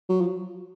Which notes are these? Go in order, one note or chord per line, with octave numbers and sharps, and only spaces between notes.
F#3
F3